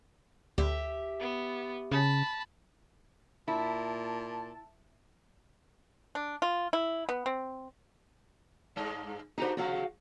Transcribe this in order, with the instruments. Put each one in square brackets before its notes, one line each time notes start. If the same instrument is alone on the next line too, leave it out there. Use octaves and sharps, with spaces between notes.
[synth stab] D2 [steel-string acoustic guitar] G4 E5
[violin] B3
[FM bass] C#3 [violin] A5 B5
[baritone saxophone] A#2 [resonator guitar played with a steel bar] E4 [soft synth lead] A5
[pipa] D4
F4
E4
B3
C4
[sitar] G2 G#3 D#5
[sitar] A#3 D4 G4 [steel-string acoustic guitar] D#4 F#4 C5
[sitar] C3 F3 G#3 [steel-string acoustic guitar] F#4 F5 F#5